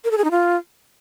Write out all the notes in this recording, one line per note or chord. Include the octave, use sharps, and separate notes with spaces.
A#4
A4
G#4
D#4
F4